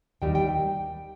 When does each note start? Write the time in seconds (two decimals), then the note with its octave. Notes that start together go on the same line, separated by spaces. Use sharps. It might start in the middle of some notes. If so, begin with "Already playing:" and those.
0.22 D#2 D#3 G3 G5
0.35 G5